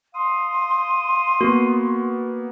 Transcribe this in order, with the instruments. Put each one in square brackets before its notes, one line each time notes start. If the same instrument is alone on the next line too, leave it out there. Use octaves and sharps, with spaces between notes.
[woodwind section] F5 D#6 [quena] C6
[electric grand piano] A#3 B3 [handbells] F#4